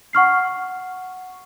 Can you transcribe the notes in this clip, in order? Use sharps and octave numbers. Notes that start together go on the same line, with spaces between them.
F#5 C#6 F6 C7